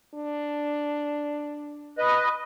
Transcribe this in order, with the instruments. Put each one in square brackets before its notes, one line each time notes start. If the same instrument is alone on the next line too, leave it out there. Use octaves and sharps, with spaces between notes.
[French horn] D4
[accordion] B4 D#5